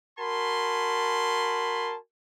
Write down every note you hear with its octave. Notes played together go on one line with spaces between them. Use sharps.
F#4 A#4 G#5 A5 B5 C6